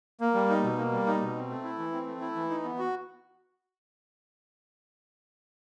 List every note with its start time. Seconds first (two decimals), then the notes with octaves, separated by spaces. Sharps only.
0.21 A#3
0.34 G3
0.50 D#4
0.64 B2
0.78 A#3
0.92 G3
1.07 D#4
1.21 B2
1.35 C4
1.50 A3
1.63 E4
1.78 E3
1.92 C4
2.07 A3
2.21 E4
2.35 E3
2.50 D#4
2.64 B3
2.78 F#4